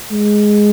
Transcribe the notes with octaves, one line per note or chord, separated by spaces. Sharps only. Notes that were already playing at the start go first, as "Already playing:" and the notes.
G#3